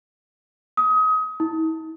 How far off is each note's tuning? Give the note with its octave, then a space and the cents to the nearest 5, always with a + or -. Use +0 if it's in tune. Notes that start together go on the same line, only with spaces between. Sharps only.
D#6 +25
E4 -45